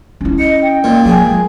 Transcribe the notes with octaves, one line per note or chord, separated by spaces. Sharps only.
C#4 E4
D#5 C#7
G5
A#2
F#3 G#4
G#3